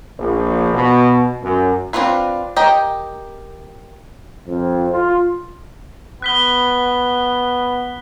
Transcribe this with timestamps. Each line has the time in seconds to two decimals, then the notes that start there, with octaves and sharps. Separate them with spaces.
0.18 A#1
0.73 B2
1.41 F#2
1.93 C4 D4 E4 F4 B4
2.57 G4 A#4 D#5 G5
4.48 F2
4.92 F4
6.22 B3 F#6 B6 G7